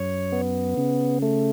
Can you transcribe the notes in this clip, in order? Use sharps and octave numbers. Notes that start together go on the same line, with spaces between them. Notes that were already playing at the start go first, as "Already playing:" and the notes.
Already playing: F#2 C#5
B3
C#3
A3